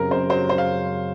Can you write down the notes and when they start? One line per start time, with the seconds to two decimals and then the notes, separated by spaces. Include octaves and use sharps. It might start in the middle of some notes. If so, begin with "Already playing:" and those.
Already playing: F#2 C#3 F#3 C4 A#4
0.11 F#2 C5
0.30 F#3 C5
0.49 C#3 C5
0.58 F5